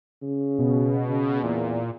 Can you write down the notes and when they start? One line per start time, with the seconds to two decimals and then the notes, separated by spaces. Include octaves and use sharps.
0.22 C#3
0.59 B2
1.09 C#3
1.43 E2 A#2